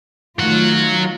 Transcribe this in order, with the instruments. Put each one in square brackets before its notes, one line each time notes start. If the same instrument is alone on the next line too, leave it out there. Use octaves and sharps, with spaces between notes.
[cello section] D#3 A3 F4 [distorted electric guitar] F#3 F#5